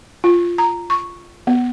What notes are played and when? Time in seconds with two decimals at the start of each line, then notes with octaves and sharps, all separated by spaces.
0.24 F4
0.58 A#5
0.90 C#6
1.47 B3